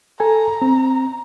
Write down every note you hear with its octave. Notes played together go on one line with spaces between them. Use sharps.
A4 G#5 A#5
C4